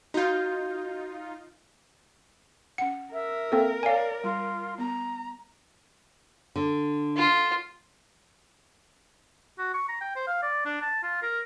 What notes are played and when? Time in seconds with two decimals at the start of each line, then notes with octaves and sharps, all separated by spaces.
0.14 D#4 F4 F#4 G6
2.78 C#4 F#5 C#7
3.13 A#4 E5
3.52 A#3 C4 A4
3.83 C#5 D5 F5 G#5 A5
4.24 G3 F4
4.78 B3 A#5
6.56 D3
7.17 F4
9.59 F#4
9.74 C#6
9.89 A#5
10.01 G5
10.16 C5
10.27 F5
10.42 D5
10.65 D4
10.81 A5
11.03 F4
11.22 A#4